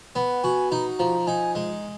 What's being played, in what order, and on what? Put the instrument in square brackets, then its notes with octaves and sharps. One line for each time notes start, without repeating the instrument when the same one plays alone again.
[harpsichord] B3 [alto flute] F#5
[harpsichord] F#4 [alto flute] G#5
[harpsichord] D#4 [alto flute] A#5
[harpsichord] F3 [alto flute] A#5
[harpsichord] D#4 [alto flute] G#5
[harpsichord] G#3